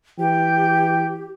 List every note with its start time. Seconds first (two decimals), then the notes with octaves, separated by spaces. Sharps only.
0.19 E3 G4 G5